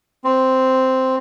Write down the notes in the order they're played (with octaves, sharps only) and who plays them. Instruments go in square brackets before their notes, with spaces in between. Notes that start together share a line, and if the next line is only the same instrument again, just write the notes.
[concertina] C4